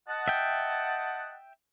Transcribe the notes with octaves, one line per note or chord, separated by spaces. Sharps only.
D#5 F#5 A5
E5 G5